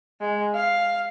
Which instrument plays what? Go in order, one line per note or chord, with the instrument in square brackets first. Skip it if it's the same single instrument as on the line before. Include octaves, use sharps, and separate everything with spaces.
[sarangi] G#3
F5